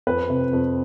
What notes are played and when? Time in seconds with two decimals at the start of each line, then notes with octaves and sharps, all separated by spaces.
0.07 F2 B4
0.30 C3
0.53 F2